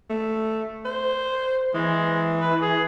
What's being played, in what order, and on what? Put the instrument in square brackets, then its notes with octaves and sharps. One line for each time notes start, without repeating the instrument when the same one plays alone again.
[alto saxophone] A3
C5
[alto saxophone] E3 [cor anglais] G#3
[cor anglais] B4
G#4